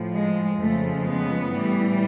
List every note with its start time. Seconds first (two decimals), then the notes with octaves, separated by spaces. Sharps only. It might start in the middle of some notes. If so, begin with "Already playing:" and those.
Already playing: A2 F3
0.14 G#3
0.61 F2 C#3 F3 G#3 A3
1.07 B3
1.54 A2 E3 G3